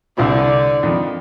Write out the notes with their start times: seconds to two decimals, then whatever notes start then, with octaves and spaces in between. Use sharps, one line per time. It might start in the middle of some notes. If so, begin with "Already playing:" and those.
0.17 C2 D3 C4 E4
0.83 F2 D#3